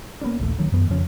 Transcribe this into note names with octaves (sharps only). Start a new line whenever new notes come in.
A#3 B3 C#4 D4
A#1 D#2 A3
D2 D#3 F#3
F#2 B3
F2 C#3 F3 C#4